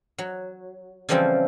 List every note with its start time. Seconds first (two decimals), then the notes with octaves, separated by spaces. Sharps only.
0.18 F#3
1.09 C#3 E3 F3 G3 C4 A4